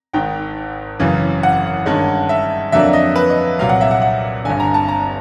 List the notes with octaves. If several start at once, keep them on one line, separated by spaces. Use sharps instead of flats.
G#1 G#2 D#3 G5
F#1 F#2 C#3 E3
F#5
G2 D#3 G#3 C#4
E5
F2 D3 F#3 A#3 D4 E5
D#5
B4
D#5
C2 A#2 F#3 F5
F#5
E5
F#5
F#5
G1 G2 D3 G#5
A#5
A5
A#5